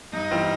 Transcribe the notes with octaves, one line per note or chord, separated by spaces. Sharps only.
G2 D#4
E3 G3 C4 F4